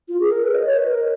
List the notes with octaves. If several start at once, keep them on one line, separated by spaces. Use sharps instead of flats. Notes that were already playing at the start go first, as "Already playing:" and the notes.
F4
G#4
A#4
B4
D#5
C#5
B4
A#4